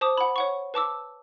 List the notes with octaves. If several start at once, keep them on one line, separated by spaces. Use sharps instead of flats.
C5 A5 D6 D#6
F#5 B5
C#5 F#5 C#6
B4 A5 D6 E6